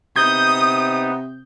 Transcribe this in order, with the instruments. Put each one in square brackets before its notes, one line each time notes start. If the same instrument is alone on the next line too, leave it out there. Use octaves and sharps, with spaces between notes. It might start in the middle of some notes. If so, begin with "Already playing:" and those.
[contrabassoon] C3 [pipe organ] B3 D#4 [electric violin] D#6 [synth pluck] G6